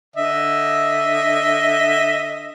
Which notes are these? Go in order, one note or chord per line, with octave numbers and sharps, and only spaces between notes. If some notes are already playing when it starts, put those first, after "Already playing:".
D3 D#5 E5